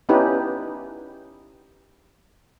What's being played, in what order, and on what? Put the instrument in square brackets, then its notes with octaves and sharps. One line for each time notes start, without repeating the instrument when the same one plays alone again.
[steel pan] B3 C#4 D#4 E4 G4 B4